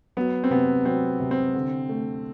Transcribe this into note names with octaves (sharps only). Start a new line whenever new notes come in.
F#3 B3
C4
C3 B3
F#3 C4
C3
C4
D3
A3